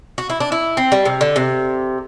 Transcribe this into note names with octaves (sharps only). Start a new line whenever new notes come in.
F#4
E4
D4
E4
C4
G3
C3
D3
C3